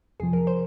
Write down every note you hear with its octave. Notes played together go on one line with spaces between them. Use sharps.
F2 C3 F3 G#4
A#4
C5